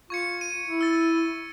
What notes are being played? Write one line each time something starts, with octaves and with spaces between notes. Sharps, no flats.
F4 C#6 G#6 C#7
D#7
E4
E6 A6